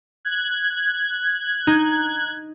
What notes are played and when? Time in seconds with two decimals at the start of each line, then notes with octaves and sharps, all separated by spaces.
0.25 F#6 G#6
1.67 D#4